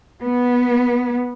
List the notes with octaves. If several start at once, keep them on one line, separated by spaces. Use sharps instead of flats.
B3